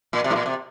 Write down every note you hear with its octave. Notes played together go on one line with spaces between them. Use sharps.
A#2
C3
A2
A#2
C3